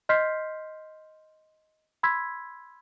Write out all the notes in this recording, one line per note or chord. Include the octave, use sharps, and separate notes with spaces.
D#5 C6 F6 G6 B6 C7
B5 C6 E6 G#6 B6